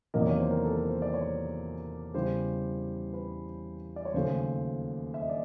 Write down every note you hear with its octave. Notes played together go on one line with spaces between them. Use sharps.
E2 C3 D#3 F#3 A#3 D#5
D5
C#5
C5
A#4
A4
A#4
C5
D5
C#5
E2 C#3 E3 G3 C5
B4
D5
C#5
D#2 C#3 F#3 A3 C5
E5
D#5
D5